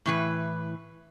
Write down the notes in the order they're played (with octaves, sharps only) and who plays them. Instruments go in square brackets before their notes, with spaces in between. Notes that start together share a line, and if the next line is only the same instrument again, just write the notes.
[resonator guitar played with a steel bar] A2 E3 B4